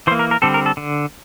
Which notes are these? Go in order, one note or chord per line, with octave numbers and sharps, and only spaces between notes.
E3 A#3 C5
A#4
A#4
D3 G3 C4 A4
A#4
A4
D3